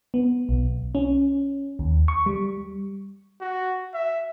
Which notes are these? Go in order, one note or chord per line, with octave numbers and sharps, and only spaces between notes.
B3
B1
C#4
D#2
C#6
G3
F#4
E5